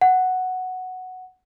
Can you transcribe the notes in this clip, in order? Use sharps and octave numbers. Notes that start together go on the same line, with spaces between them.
F#5